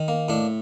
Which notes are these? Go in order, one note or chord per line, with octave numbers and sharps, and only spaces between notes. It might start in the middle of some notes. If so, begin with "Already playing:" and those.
Already playing: D#3
A#3
A2 D4